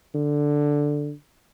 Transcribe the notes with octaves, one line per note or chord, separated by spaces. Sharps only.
D3